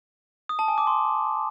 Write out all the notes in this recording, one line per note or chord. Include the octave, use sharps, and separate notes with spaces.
D#6
A5
G#5
D6
C6